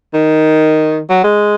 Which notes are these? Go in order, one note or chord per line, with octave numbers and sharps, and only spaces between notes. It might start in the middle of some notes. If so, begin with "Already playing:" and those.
D#3
F#3
G#3